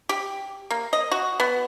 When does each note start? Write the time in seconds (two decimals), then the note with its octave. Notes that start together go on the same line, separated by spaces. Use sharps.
0.09 G4
0.71 A#3
0.93 D#5
1.12 F#4
1.40 B3